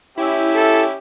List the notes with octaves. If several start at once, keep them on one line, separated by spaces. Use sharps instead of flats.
C#4 E4 G4 E5
A4